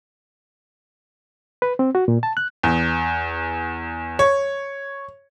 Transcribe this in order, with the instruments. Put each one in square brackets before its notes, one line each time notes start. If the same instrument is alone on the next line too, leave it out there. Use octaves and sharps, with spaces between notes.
[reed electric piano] B4
C4
F#4
A#2
A5
F#6
[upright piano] E2
C#5